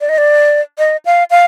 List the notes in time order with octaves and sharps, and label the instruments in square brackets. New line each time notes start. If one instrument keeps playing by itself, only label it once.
[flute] D5
D#5
D5
D#5
F5
F5